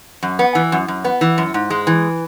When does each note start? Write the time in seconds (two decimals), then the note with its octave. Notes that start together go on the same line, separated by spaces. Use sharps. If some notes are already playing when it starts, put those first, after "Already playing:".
0.23 F#2
0.39 B3
0.55 E3
0.72 F#2
0.88 F#2
1.04 B3
1.21 E3
1.38 F#2
1.54 G#2
1.70 G#3
1.87 E3